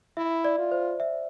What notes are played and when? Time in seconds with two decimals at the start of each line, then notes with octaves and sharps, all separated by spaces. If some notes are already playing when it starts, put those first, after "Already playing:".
0.17 E4 E5
0.45 D5
0.58 F4
0.72 C5
1.00 E5